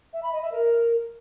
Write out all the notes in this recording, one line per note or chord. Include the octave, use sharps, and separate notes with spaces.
E5
B5
D#5
E5
A#4